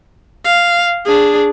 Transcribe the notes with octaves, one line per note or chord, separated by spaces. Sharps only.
F5
D4 G#4